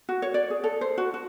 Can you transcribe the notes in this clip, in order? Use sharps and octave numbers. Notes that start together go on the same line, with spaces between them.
F#4
C#5
D5
G#4
A4
C5
F#4
F#4